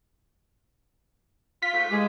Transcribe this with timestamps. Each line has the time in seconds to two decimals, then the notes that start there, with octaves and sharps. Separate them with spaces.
1.63 F4 B6
1.74 G#2 A3 F4
1.91 E3 G#3 G4 G#4